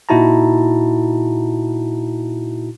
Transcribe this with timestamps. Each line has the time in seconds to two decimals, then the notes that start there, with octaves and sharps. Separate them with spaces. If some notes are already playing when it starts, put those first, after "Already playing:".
0.09 A#2 D#4 E4 F#4 A5 A#5